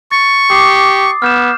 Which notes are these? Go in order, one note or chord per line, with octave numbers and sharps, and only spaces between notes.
C#6 A6
G4 D6 D#6 C7
B3 F6 G6 E7